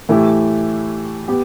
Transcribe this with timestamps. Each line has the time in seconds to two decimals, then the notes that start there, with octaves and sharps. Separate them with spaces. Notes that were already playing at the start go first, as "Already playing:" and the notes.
0.09 A2 E3 A3 E4 G4
1.28 B3 G4